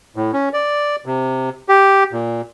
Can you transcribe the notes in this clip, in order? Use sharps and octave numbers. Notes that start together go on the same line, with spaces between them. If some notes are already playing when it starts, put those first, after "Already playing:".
A2
C#4
D5
C3
G4
A#2